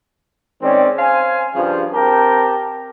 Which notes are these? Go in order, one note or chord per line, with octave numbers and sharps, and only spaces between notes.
D#3 G#3 C4 C#4 D5
C5 F5 G#5
G2 C#3 F3
C4 G4 A#4 G5 A5